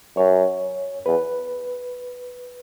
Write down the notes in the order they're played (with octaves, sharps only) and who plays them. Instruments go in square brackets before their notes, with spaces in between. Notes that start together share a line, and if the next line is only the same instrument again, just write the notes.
[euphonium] F#2 [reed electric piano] C#5
[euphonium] E2 [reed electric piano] B4